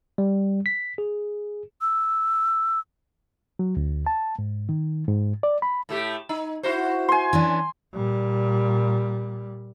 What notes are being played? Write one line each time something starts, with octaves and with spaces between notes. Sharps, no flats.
G3
B6
G#4
E6
F#3
D2
A5
G#2
D#3
G#2
D5
B5
A2 A3 G4
D#4
E4 F#4 C5
G#5 C6
E3 C#4 D4
A#2 G3